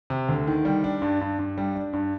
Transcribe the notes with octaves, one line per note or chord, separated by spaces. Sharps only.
C3
D2
D#3
G3
D4
G2
G2
G2
G3
D4
G2